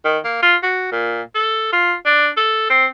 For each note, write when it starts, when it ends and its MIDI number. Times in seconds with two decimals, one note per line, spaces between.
0.05 0.19 51
0.24 0.39 58
0.42 0.56 65
0.63 0.88 66
0.92 1.22 46
1.35 1.69 69
1.72 1.94 65
2.06 2.29 62
2.37 2.67 69
2.70 2.86 60